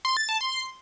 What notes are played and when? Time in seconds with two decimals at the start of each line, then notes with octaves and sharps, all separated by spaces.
0.05 C6
0.17 A6
0.29 A5
0.41 C6